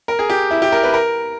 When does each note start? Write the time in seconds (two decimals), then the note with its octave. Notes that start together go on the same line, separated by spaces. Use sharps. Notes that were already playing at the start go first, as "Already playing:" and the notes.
0.08 A#4
0.19 G#4
0.30 G4
0.51 E4
0.62 G4
0.72 A#4
0.83 B4
0.94 A#4